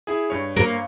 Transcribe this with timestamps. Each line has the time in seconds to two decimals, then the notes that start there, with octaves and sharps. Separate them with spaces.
0.07 E4 G#4
0.30 G2 C#5
0.57 A#3